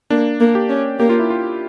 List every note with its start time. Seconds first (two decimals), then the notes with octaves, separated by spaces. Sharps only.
0.10 A#3 D4
0.40 A#3
0.55 G4
0.69 C#4
0.99 A#3 G4
1.09 F4
1.19 E4
1.30 F4